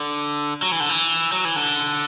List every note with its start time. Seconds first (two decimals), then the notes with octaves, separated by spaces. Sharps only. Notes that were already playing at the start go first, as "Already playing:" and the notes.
Already playing: D3
0.62 F#3
0.72 E3
0.80 D3
0.89 E3
1.32 F#3
1.45 E3
1.56 D3